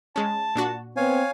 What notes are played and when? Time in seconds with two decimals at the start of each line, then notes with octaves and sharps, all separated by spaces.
0.16 G#3 C#4 A5
0.56 A#2 D4 F#4
0.97 B3 C4 C#5 F5 G#5